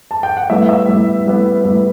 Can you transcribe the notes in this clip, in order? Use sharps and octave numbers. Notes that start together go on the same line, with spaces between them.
A5
G5
F#5
A2 G3 B3 E5
E5
A2 G3 B3
A2 G3 B3
A2 G3 B3